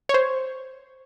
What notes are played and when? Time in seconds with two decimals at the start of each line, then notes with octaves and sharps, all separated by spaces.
0.09 C#5
0.14 C5